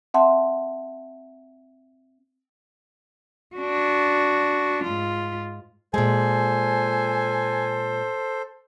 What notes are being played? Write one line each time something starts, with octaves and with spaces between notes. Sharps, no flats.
C4 E5 F#5 A5 C6
D4 F#4
G#2 F4
A#2 G#3 A4 C5 G#5